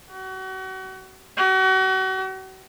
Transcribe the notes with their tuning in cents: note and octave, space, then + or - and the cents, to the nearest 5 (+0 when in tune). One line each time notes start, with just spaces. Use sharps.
F#4 +35
F#4 +35